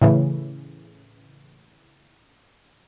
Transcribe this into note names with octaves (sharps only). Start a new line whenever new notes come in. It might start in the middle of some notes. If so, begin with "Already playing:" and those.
A2 C#3 E3